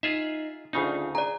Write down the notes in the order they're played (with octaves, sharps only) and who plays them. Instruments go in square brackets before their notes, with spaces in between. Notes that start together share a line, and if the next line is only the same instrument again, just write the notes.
[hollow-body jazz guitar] D#4 [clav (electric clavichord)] F4 G#4 E5
[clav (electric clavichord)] D2 C#3 D#4 [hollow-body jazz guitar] D4 F4 G#4
[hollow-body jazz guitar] G#4 [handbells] D5 A#5